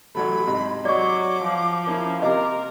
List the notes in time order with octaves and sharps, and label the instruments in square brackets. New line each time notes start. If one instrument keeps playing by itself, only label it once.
[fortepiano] A1 F#3 A3 [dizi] B5
[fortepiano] G#2 C3
[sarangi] F#3 [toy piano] D5 D#5 C#6 [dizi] D6
[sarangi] F3
[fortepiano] A#3 C#4 E4
[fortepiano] C3 A#3 [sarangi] A#4 [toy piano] D#5 [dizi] D6